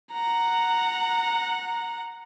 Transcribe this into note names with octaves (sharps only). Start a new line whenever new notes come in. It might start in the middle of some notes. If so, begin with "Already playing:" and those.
F#5 A#5